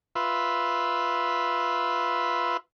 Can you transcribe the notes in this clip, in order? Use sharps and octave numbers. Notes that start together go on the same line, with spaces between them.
F4 B4 E5